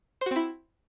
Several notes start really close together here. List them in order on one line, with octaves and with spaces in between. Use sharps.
C5 F#4 C4 E4